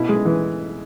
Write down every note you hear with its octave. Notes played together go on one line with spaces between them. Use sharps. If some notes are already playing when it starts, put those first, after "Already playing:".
Already playing: B2 E4
G#3
E3